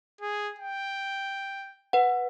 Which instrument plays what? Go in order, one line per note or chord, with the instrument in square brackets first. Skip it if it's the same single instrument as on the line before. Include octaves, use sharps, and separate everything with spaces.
[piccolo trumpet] G#4
G5
[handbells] B4 F#5